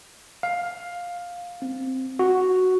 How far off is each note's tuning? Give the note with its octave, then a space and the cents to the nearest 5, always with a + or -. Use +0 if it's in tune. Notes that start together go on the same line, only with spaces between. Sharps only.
F5 +10
C4 +0
F#4 +5